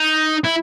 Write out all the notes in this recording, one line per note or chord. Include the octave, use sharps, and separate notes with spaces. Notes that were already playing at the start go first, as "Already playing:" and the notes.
Already playing: D#4
E4